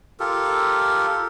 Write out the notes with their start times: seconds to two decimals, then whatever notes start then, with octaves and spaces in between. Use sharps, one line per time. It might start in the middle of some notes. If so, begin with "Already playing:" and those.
0.20 F4 G4 A4 A#4